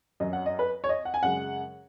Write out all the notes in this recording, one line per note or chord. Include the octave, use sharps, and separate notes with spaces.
F#2 F#3 D#5
F#5
D#5
B4
C#5
D#5
F#5
G#5
F#2 C#3 G#3 F#5